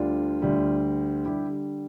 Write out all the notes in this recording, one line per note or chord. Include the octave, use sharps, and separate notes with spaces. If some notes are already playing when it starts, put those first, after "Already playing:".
Already playing: D2 D3 G3 D4 F4
D2 D3 G3
D3 G3 E4 G4